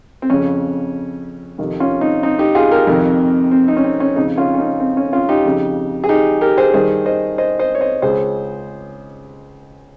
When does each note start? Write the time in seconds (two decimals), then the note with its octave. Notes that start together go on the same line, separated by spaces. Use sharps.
0.22 C4
0.30 F2 C#3 C#4
1.58 F2 C3 D#3
1.80 C#4 F4
2.01 C4 D#4
2.23 C4 D#4
2.39 D#4 G4
2.55 F4 G#4
2.71 G4 A#4
2.87 F2 C3 D#3
3.51 C4
3.68 C4 D#4
3.77 C#4
3.84 C4
4.00 C#4
4.16 F2 C#3 C4 D#4
4.37 C#4 F4
4.54 C#4
4.59 C4 D#4
4.80 C4
4.97 C#4
5.13 C#4 F4
5.29 D#4 G4
5.45 F2 C#3
6.04 G#4
6.09 D#4 G4
6.41 G4 A#4
6.57 G#4 C5
6.74 G2 D#3 G#4 C5
7.06 C5 D#5
7.38 C5 D#5
7.59 C5 D#5
7.75 C#5
7.81 C5 D#5
8.02 C#2 C#3 G#4 C5